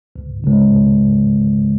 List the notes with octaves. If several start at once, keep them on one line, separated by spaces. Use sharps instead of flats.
C#2
C#3 G#3
C#2